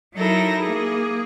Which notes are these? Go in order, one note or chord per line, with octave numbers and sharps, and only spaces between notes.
F#3 D#4 E4 A4 A#4 A#6
A#3 G#4